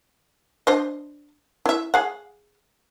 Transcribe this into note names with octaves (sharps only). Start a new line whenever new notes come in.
D4 C5 D#5
E4 E5
G#4 F5 F#5